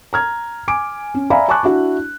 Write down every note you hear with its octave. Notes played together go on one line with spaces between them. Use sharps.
A#5 F6 G#6
G#5 D6 D7
C#4
D5 E5 F5 G#5 A#5 B5
G#5 A5 B5 C#6 D6 F#6
D4 E4 F#4